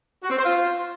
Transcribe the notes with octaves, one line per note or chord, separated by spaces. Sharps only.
F#4
C4
C5
F4